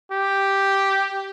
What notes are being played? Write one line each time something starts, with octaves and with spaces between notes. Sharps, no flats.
G4